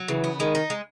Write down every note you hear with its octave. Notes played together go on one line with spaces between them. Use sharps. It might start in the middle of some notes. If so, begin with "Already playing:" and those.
Already playing: F#3
C#3 E3
B3
D#3 G#3
D#4
G#3